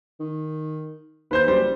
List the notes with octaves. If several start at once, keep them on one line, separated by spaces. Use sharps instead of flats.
D#3
D#2 B4 C5 G6
F#1 G3 C5